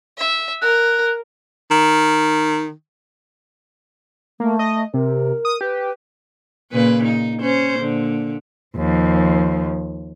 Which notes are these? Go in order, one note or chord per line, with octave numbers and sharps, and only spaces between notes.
E5
A#4 F#6
D#3
A3 A#3
D#5
C3 A#4
D#6
G4 B4
A#2 C#3 B4
D#4
C#4 C5
A#2 D3
D#2 F3